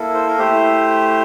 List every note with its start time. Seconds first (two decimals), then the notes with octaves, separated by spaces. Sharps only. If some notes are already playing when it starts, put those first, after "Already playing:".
Already playing: A#3 E4 A4
0.14 C5
0.27 A#4
0.38 A3 E4 G4 C5